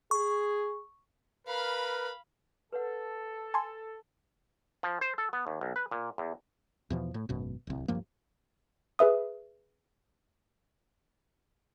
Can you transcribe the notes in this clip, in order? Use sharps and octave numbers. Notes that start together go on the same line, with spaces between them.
G#4 C#6
A#4 B4 F5 B5
A4 B4 C#5 F#5
G#5 A5 C6
F3
C5
A4
B3
D#2
B1
B4
A#2
E2
E2 B2 F3
A2
G#1 F#2 B2
D1 C2
D1 G2 F3 A#3
G#4 B4 E5 D#6